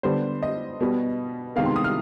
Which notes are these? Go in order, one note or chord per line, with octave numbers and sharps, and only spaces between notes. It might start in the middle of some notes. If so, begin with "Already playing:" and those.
D3 G3 B3 C5
D#5
B2 G3 B3
C3 D#3 G#3 B3 F5
C6
D#6
F6